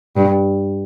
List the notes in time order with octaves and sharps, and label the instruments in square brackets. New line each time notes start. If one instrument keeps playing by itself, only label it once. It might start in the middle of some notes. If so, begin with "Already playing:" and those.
[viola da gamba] G2